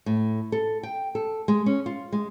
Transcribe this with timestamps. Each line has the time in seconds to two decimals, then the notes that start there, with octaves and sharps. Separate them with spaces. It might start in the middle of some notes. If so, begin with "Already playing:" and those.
0.06 A2
0.52 A4
0.83 G5
1.15 A4
1.48 G#3
1.66 C#4
1.86 F4
2.12 G#3